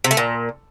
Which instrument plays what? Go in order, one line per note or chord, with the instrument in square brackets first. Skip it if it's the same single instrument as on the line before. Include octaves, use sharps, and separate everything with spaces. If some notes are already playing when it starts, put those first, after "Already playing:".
[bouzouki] C3
A3
A#2